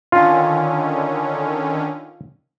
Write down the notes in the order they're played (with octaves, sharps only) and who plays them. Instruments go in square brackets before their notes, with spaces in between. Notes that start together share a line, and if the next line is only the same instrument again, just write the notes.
[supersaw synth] D3 D#3 C#4 [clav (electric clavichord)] F4